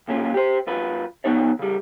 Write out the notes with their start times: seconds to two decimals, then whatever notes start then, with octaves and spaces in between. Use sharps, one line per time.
0.08 B1 A#2 C#4 F4
0.34 G4 C5
0.67 F#2 F4 B4
1.24 F3 B3 D#4 C#5 D5
1.59 C#3 G3